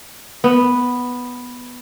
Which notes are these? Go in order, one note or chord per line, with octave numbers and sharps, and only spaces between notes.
B3